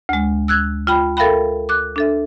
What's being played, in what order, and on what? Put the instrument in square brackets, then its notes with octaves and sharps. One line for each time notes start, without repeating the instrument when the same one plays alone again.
[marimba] D2 G#3
E6 F#6 G#6
F4 G5 B5
A4 A#4 E5 F5 G5 B5
D6 F#6
D4 A4 E5